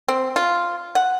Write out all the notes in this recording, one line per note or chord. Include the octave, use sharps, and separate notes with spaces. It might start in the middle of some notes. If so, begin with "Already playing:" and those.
C4
F4
F#5